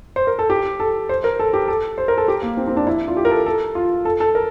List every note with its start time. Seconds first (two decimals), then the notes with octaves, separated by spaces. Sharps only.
0.16 C5
0.27 A#4
0.39 A4
0.50 G4
0.80 A4
1.09 C5
1.24 A#4
1.39 A4
1.53 G4
1.68 A4
1.98 C5
2.08 A#4
2.18 A4
2.28 G4
2.42 A#3
2.57 C4
2.67 C4
2.77 D4
2.87 E4
3.08 F4
3.17 G4
3.25 A#4
3.31 A4
3.46 A4
3.75 F4
4.05 A4
4.20 A4
4.35 A#4